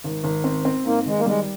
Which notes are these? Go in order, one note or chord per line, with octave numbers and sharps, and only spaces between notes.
G#1
G#1
C4
C4
G#2 A#3
G#1 G#3
A#3
G3 G#3